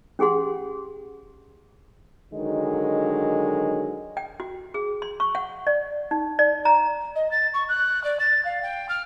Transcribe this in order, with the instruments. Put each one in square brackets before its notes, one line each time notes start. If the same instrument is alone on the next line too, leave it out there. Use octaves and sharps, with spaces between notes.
[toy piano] C#4 G4 G#4 F#5 C6
[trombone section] D3 D#3 F#3 G#3
[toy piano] G5
F#4
G#4
C6
C#6
F#5
D5
D#4
D5
A#5
[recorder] D#5
A6
C#6
F#6
D5
A6
F5
G5
F6